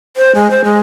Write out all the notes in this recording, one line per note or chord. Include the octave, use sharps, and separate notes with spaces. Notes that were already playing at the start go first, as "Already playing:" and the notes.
C5
G#3
C5
G#3